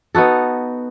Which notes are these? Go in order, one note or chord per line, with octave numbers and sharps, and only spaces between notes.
B3 D#4 F#4 A4